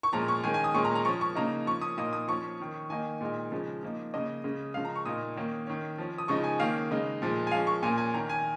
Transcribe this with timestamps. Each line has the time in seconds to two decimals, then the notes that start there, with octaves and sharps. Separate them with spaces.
0.03 C#6
0.13 A#2 F3 G#3 C#4 A#5
0.28 C#6
0.43 D#3 G#3 C#4 G#5
0.54 G#5
0.64 D#6
0.74 A#2 G#3 C#4 C#6
0.85 A#5
0.95 A#5
1.05 F3 C#4 C#6
1.21 C#6
1.35 C#3 A#3 D#4 A#5
1.66 F3 C#4 C#6
1.81 D#6
1.97 A#2 A#3 D#4 D#6
2.13 D#6
2.28 F3 C#4 C#6
2.59 D#3 C#4
2.90 D#3 A#3 D#4 G#5
3.21 A#2 G#3 D#4
3.51 C#3 F3 G#3 C#4
3.83 F3 A#3 D#4
4.13 C#3 A#3 C#4 D#5
4.44 C#3 G#3 C#4
4.74 C#3 F3 G#3 F5
4.85 A#5
4.96 C#6
5.05 A#2 A#3 D#4 D#6
5.36 D#3 A#3 C#4
5.67 D#3 C#4
5.98 F3 C#4
6.18 D#6
6.28 C#3 F3 G#3 D#4 C#6
6.44 G#5
6.60 D#3 A#3 C#4 F5
6.91 C#3 G#3 D#4
7.22 A#2 F3 G#3
7.47 G#5
7.51 F3 G#3 C#4 F5
7.67 C#6
7.82 A#2 A#3 C#4 G#5
7.98 G#5
8.14 D#3 C#4 A#5
8.29 G#5